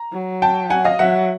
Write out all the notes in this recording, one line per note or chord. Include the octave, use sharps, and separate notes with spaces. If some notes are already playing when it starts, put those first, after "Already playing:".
Already playing: A#5
F#3
G5 A5
F#5 G#5
D#5 F5
F#3 E5 F#5